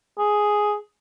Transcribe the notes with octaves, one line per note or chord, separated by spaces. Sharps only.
G#4